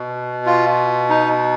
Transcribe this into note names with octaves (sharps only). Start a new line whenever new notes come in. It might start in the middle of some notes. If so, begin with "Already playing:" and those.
Already playing: B2
F4
D#4